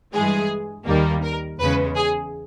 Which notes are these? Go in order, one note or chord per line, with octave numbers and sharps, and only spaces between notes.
G2 E3 G#3 G#4
D#2 D#3 G3 A#3
A#4
E2 C#3 G#3 B4
G#4